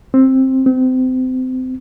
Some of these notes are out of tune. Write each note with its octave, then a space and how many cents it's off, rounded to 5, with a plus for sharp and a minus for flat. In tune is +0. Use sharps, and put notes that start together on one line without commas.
C4 +10
C4 -30